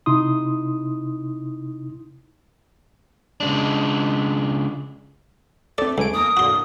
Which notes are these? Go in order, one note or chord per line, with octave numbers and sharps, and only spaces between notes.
C3 D#4 E4 C6 D#6
C#3 G#3 D4
A3 C4 A4 D5
C#2 A4 G#5 D7
E2 A#3 A#4 D#6
A2 D3 A#3 F#4 C6